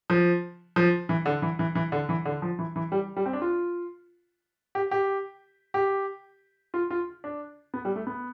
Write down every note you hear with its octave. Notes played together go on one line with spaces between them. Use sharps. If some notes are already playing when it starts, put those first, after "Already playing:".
F3
F3
E3
D3
E3
E3
E3
D3
E3
D3
F3
E3
E3
G3
G3
C4
D4
F4
G4
G4
G4
F4
F4
D4
B3
G3
A3
B3